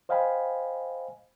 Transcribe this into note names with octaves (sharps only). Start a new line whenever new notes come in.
C5 D#5 F5 G5 G#5 B5